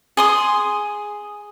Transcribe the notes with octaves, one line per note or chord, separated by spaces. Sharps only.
G#4 C6 D#6